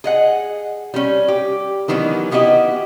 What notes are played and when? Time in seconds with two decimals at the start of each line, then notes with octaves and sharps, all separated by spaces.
0.04 G#4 D#5 F#5
0.94 G3 C#4
1.28 G4
1.88 D#3 E3 F#3 B3 C#4
2.31 B3 E4 F#4 G4 D#5